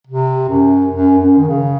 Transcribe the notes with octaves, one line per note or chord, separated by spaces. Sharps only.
C3
F#2
F#2
F#2
D#3
C#3